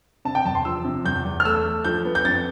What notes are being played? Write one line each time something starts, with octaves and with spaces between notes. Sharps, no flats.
C3 A5
G5
E2 A5
C6
F3 E6
C3
E2 G6
E2
F6
A3 E6
A3
F3 G6
B3
G6
F2 A6